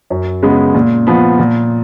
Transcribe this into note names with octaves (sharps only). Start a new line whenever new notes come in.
F#2
C#3 G#3 B3
A#2
F3 B3
A#2